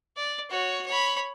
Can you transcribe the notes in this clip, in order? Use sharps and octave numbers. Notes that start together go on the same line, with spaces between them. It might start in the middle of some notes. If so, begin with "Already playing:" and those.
D5
F#4 C#5
C#5 B5